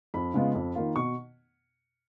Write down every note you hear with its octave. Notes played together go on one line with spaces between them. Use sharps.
F2 B5
C#3 G#3 B3 F4
F2
D#3 A#3 F4
B2 C#6